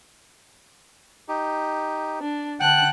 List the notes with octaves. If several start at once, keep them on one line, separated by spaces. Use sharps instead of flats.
D#4 G4
D4
D3 F#5 G5 A5 F#6